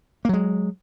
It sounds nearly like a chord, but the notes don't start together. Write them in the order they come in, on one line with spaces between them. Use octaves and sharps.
A#3 F#3 G#3